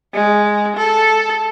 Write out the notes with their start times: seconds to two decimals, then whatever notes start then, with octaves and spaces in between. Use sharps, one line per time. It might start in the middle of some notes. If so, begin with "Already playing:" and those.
0.14 G#3
0.77 A4